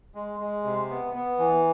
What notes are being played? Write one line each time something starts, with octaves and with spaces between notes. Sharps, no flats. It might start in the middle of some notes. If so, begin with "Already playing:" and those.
G#3
G#3
C3
B3
B3
E3